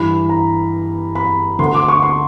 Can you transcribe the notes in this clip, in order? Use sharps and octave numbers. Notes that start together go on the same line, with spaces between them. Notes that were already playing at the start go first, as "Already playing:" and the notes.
Already playing: G2 E3 B5
A#5
B5
D2 D3 C6
D6
C#6
C6